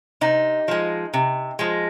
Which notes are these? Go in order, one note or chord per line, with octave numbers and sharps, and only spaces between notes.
C3 D#4
F3 G#3
C3
F3 G#3